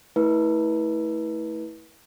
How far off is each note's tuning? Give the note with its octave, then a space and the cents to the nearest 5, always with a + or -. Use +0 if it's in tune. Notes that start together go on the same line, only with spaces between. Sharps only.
A3 +0 E4 -25 B4 -30